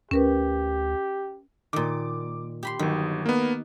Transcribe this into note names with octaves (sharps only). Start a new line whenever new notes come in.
D2 C#4 G4 A#4 B4
A#2 D#3 D6
G4 B5 C6
G1 D#3 F#3
A#3 B3